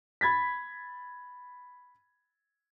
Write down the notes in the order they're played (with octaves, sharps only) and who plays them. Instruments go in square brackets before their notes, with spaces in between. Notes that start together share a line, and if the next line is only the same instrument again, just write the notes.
[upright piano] B5 G#6 A6 B6